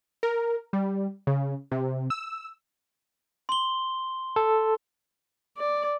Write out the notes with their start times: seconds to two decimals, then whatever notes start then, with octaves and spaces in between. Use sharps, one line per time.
0.23 A#4
0.73 G3
1.27 C#3
1.72 C3
2.10 E6
3.49 C6 G7
4.36 A4
5.57 D5